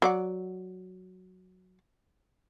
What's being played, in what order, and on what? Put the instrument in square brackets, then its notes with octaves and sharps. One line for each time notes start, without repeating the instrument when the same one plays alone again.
[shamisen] F#3 D5 F#5